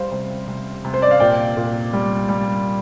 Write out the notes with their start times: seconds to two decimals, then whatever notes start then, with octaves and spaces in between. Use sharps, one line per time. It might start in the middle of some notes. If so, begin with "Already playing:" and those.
Already playing: G3 C5 F5
0.12 C3
0.48 C3
0.85 C3
0.94 C5
1.02 D5
1.11 F5
1.20 A#2 D5 G5
1.57 A#2
1.93 G3
2.29 G3